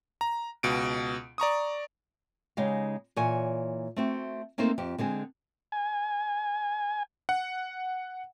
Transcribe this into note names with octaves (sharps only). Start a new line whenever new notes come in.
A#5
C#2 B2 D7
D5 A#5 C#6 D#6
C#3 G#3 D#4 G4 F5
A#2 E3 C#5 G#5
A3 C4 F#4
A3 A#3 C4 D#4 A4 C5
F2 G4
D3 G#3 C4 G#4
G#5
F#5